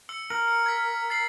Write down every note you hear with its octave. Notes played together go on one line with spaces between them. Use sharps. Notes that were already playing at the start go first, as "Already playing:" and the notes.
E6 C#7 F#7
A#4 F#7
C#7
G#6 B6
A6 C7 F#7